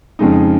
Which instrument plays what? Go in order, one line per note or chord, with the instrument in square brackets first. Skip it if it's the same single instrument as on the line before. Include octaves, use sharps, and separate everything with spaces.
[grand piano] F2 C#3 G#3 D#4